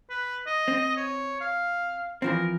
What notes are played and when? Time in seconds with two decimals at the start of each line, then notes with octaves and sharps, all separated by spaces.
0.10 B4
0.46 D#5
0.68 C4
0.97 C#5
1.41 F5
2.22 E3 F3 C4 A#4